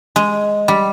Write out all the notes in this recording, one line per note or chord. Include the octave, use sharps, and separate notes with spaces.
G#3
G3